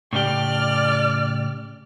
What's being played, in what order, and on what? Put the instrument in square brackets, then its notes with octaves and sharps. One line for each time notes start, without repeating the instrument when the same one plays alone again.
[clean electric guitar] A2 C#3 G4 [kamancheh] D5 F6